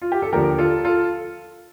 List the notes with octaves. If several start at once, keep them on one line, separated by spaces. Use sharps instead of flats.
F4
G4
A4
D#2 D3 F3 G4 A#4
F4 A4
F4 A4